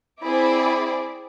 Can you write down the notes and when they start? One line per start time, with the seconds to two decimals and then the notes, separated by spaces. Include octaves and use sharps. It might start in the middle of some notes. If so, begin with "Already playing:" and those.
0.24 C4 E4 G#4 D5 B5 D6